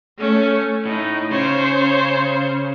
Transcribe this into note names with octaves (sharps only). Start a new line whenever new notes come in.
A3 C#4
A2 D#4
C#3 C5 C#5